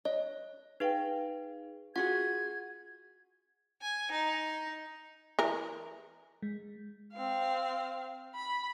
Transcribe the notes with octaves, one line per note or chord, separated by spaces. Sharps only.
C#5 D#5
D#4 G#4 B4 F5 G5
F4 F#4 G#4 F#5 G#6
G#5
D#4
E3 A#4
G#3
C4 F5
B5